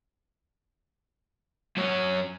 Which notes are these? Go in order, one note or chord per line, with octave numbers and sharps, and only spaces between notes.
F#2 C#4